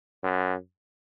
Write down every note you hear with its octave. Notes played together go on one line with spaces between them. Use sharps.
F#2